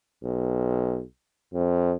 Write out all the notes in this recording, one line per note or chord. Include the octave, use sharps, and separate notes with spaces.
B1
F2